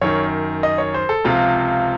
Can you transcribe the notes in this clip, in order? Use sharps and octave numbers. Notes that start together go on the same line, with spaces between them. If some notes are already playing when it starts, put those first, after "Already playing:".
F#2 D#3 C#5
D#5
C#5
C5
A4
C#2 C3 F3 F4